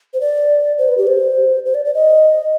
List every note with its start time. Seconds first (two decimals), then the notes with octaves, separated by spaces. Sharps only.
0.13 C5
0.20 D5
0.78 C5
0.88 B4
0.98 G4
1.07 C5
1.65 C5
1.74 D5
1.85 D5
1.94 D#5